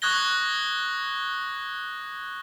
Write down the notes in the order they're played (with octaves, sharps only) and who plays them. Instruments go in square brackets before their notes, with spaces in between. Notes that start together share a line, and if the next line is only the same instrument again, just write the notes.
[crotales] C#6 D#6 F#6 G#6 A#6 G7